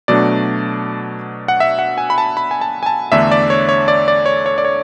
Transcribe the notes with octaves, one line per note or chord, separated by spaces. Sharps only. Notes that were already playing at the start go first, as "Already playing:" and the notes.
B2 F#3 A3 D4 D5
F#5
E5
F#5
G#5
B5
A5
B5
G#5
A5
G#5
A5
E2 D3 A3 D4 E5
D5
C#5
C#5
D5
D5
C#5
C#5
D5
C#5